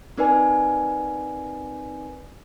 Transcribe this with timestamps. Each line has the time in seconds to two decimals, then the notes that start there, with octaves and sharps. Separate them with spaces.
0.17 C4 D#4 A#4 B4 D5 G#5